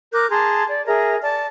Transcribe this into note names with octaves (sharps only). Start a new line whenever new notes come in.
A#4 D6 F#6 G6
G#4 A5 A#5 C6
D5
G#4 A#4 E5 A#5
D5 A5